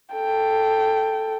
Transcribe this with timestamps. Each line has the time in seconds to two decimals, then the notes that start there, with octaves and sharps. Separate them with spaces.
0.13 A4 G5